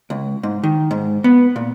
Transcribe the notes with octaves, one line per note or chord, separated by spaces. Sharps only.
C#2
G#2
D#3
G#2
B3
A#2